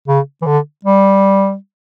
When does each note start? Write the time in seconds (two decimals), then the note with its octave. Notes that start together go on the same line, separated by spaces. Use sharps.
0.08 C#3
0.42 E3
0.47 D3
0.85 G3